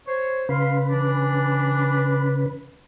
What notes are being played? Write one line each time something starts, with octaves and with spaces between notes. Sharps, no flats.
C5 C#5
C#3 B4 F5 C6
E3 D4